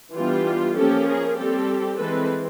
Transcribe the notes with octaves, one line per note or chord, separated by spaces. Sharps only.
E3 G3 B3 D4 F4 G4
F3 A#3 C#4 G4 A4
G#4 A#4
G3 C4 G4 A4
E3 G#3 C4 A4 B4